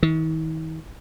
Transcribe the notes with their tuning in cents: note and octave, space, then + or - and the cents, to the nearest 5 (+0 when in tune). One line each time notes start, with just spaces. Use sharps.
D#3 +45